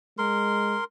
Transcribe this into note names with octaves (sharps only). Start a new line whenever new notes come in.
G#3 A#4 C6